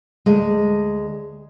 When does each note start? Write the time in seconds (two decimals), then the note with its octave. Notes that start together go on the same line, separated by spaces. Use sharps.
0.26 D2 G#3